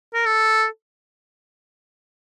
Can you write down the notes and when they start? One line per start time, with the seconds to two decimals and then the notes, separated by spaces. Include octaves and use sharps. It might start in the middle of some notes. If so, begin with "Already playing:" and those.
0.14 A#4
0.26 A4